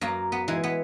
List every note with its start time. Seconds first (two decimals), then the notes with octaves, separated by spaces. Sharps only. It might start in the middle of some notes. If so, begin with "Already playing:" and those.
0.01 F#2 A#3
0.32 B3
0.48 E3 G#3
0.64 B3